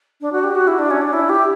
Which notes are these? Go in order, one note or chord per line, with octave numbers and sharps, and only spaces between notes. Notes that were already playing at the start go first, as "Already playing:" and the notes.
D4
F#4
G4
F#4
E4
D4
C#4
D4
E4
G4